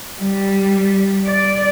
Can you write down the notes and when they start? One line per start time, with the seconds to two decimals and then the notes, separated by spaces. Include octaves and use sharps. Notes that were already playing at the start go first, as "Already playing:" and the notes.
0.19 G3
1.27 D5